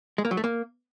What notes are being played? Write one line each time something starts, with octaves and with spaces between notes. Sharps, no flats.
G#3
A#3
F#3
A3
A#3